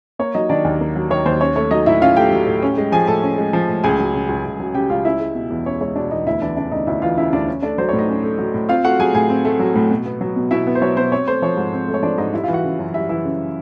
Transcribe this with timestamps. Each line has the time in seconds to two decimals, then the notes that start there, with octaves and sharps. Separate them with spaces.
0.19 A#3 C#5
0.35 F#3 D#4 D#5
0.49 D#3 D4 D5
0.65 D#2
0.81 A#3
0.96 F#3
1.10 D#3 C#5
1.25 D#2 C5
1.41 C#4 C#5
1.56 A3 C#5
1.71 F#3 D#4 D#5
1.86 A2 E4 E5
2.02 C#4 F4 F5
2.17 A3 G4 G5
2.31 F#3
2.47 A2
2.63 C#4
2.78 G#3
2.92 F3 G#4 G#5
3.07 A2 A4 A5
3.23 C#4
3.38 G#3
3.53 F3
3.68 A2
3.84 C#2 G#4 G#5
3.99 F#3
4.14 C#3
4.29 C#2
4.44 C#2
4.60 F#3
4.74 C#3 G4 G5
4.90 C#2 F4 F5
5.05 C#4 E4 E5
5.20 G#3
5.35 B2
5.50 E2
5.66 C#4 C#5
5.81 G#3 C#5
5.96 B2 D4 D5
6.11 E2 D#4 D#5
6.26 D2 E4 E5
6.41 E3 D4 D5
6.57 C#3 D4 D5
6.72 D2 D#4 D#5
6.87 D2 E4 E5
7.02 E3 F4 F5
7.17 C#3 E4 E5
7.33 D2 D4 D5
7.48 C#4
7.62 A3 D4 D5
7.78 F#3 C5
7.89 A2 C#5
7.99 D#4 D#5
8.08 C#4
8.23 A3
8.39 F#3
8.54 A2
8.69 C4 F4 F5
8.84 A3 F#4 F#5
8.99 F#3 G#4 G#5
9.14 A2 G#4 G#5
9.30 C4
9.45 A3
9.60 F#3
9.75 A2
9.91 B2
10.06 B3
10.21 F#3
10.36 B2
10.51 B2 E4 E5
10.67 B3
10.75 C5
10.82 F#3 C#5
10.97 B2 C5
11.12 C4 C#5
11.27 A3 C5
11.42 F3 C#5
11.57 G#2
11.73 C4
11.88 A3
11.94 C#5
12.03 F3 D4 D5
12.18 G#2 D#4 D#5
12.33 G3 E4 E5
12.44 E3 F4 F5
12.53 F#4 F#5
12.64 C#3
12.79 F#2
12.94 G3 E4 E5
13.09 E3 E4 E5
13.25 C#3